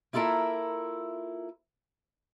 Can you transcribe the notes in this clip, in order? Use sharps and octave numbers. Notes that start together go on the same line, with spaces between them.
A#3 E4 F4 A4 A#4 E5